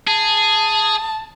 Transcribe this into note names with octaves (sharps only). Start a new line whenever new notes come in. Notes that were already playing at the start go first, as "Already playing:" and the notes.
G#4 A5